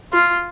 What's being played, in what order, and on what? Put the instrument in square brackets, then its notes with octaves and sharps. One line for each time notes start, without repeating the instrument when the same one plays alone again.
[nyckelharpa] F4